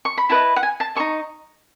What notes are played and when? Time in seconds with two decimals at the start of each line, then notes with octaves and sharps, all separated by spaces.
0.05 C#6
0.17 B5
0.29 E4 B4 D#5 A5
0.56 F#5
0.63 G#5
0.80 A5
0.95 D#4 A4 D#5 C#6